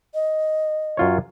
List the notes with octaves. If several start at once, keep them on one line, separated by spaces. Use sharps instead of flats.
D#5
F#2 F4 C#5